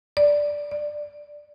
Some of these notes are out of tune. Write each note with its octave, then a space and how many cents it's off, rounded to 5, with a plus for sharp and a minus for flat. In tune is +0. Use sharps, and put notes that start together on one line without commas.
D5 -5
D5 +15